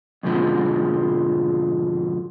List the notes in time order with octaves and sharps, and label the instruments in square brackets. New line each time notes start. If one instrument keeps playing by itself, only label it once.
[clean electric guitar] F2 G#2 B2 D3 F3 G#3